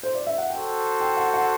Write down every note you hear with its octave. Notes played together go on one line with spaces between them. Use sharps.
C5
D5
E5
F#5
F#4 A4 C5 G5
G5
F#5
F#5